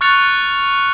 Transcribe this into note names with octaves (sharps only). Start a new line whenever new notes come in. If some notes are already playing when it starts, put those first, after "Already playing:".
C#6 F6 F#6 A6 C#7 F7